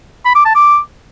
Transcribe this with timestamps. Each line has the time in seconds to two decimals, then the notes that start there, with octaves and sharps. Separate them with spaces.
0.25 B5
0.35 D6
0.45 A5
0.55 D6